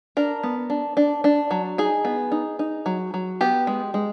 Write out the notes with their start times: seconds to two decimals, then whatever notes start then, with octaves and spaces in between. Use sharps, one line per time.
0.17 D4 A#4
0.43 B3
0.70 D4
0.97 D4
1.24 D4
1.51 F#3
1.78 D#4 G#4
2.05 B3
2.32 D#4
2.59 D#4
2.86 F#3
3.14 F#3
3.41 B3 G4
3.67 G#3
3.94 G#3